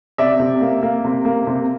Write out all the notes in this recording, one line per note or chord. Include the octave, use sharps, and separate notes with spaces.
C3 D5 E5
C3
A#3
A#3
C3
A#3
C3